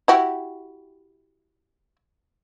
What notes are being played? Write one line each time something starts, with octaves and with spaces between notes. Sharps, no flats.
E4 F#4 G4